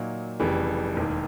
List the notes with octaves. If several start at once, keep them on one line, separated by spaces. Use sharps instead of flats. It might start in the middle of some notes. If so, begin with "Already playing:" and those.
Already playing: A#2 F#3 A#3 D#4
F1 F2 C#3 E3 G3
E1 D#2 D#3